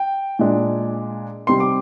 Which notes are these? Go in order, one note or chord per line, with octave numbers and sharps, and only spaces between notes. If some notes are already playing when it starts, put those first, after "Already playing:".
Already playing: G5
A#2 G#3 D4
C3 G3 C4 D#4 C6
D6